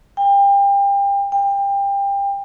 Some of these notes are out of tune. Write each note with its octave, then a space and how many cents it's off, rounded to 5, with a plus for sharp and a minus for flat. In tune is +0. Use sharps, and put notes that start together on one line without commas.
G5 +30
G5 +25